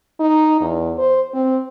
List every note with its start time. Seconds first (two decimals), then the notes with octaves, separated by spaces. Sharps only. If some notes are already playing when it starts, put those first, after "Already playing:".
0.20 D#4
0.61 E2
0.98 C5
1.34 C4